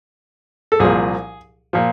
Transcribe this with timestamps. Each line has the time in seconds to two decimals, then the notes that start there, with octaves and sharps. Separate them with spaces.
0.72 A4
0.80 C2 A#2 F3 G#4
1.73 A#2 F3